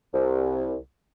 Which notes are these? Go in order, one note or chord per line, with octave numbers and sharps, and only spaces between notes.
C2